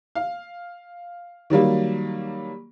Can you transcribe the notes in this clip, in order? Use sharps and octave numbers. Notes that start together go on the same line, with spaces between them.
F5
D#3 F#3 G3 A#3